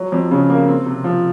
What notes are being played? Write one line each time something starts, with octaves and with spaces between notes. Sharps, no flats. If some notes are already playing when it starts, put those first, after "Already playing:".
Already playing: F#3
F2
C#3
A#3
C4
C3
F3